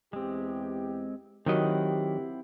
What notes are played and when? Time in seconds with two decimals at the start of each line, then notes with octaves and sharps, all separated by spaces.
0.13 E2 G#3 C4 G4
1.46 D#3 F#3 C4 E4 G4 D#5 F#5